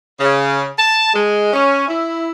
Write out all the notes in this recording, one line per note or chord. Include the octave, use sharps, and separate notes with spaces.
C#3
A5
G#3
C#4
E4